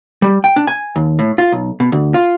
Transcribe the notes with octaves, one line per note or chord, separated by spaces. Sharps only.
G3
G5
D4
G#5
D#2
A2
F4
B1
B2
D2
F4